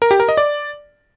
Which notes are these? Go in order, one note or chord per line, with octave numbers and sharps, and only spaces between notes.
A#4
G4
A#4
D#5
D5